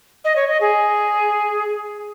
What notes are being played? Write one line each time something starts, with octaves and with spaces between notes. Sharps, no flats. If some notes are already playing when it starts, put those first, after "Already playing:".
D#5
C#5
D#5
G#4